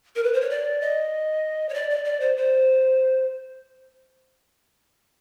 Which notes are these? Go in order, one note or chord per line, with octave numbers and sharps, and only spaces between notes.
A#4
B4
C5
C#5
D5
D#5
C#5
D5
D5
D5
C5
C5